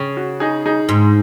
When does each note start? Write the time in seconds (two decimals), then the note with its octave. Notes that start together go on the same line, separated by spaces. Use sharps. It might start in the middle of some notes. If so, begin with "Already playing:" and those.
Already playing: C#3
0.17 F#4
0.40 D#4 G#4
0.66 D#4 G#4
0.89 G#2